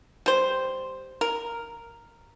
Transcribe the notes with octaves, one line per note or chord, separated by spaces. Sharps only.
G3 C5
A#4